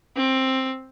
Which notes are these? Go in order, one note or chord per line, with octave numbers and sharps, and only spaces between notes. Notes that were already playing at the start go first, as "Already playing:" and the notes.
C4